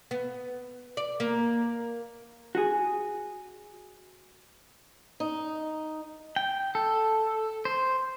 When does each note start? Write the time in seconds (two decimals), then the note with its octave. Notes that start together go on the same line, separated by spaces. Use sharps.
0.11 B3
0.97 D5
1.20 A#3
2.55 F#4 G#4
5.20 D#4
6.36 G5
6.75 A4
7.65 C5